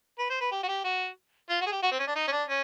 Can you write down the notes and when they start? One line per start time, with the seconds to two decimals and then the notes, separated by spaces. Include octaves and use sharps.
0.19 B4
0.30 C5
0.41 B4
0.51 G4
0.63 F#4
0.68 G4
0.84 F#4
1.50 F4
1.61 F#4
1.66 G#4
1.72 G4
1.83 F#4
1.91 C4
1.99 C#4
2.07 D4
2.16 D#4
2.27 C#4
2.32 D4
2.48 C#4